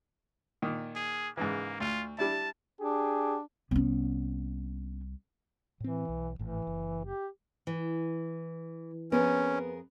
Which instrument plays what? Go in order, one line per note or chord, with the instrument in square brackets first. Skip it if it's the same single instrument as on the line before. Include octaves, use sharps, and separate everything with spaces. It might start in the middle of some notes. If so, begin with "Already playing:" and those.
[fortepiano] A#2 D#3
[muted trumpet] G#4
[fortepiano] G#2 C#3 E3 [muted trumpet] A#3
[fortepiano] D2 [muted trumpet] F4
[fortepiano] G3 D4 E4 [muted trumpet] A5
[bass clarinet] D4 [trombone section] G4 G#4
[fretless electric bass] C2 [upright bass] B3 C#4
[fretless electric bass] A2 C4 [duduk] E3
[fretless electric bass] B1
[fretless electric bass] G#1 A2 [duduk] E3
[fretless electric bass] F#1
[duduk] G4
[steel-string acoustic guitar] E3
[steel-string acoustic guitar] F2 G#4 A#4 [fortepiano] B3 [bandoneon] C#4